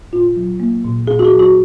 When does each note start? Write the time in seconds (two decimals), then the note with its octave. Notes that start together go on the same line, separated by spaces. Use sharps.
0.12 A#2 F4
0.37 F#3
0.60 A#3
0.84 A#2
1.07 A#2 G#4
1.19 F#4
1.25 G#4
1.32 F#3
1.39 F#4